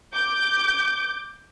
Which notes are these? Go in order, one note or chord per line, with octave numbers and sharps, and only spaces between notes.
D6 G6